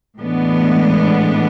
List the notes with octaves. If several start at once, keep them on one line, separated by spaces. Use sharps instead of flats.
A2 E3 G#3 B3 D4